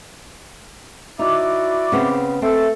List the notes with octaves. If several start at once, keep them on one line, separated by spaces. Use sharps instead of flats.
D#4 E4 F#4 D5
C#3 B3 C4
A3 C4 A4